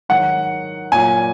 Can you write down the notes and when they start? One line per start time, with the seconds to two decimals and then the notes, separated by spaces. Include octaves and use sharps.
0.09 G#2 D#3 F#3 F#5
0.92 A#2 F#3 G#5